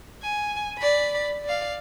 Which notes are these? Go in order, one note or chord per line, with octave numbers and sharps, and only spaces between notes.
G#5
D5 B5
D5 F5